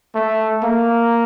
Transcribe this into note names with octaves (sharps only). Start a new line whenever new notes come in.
A3
A#3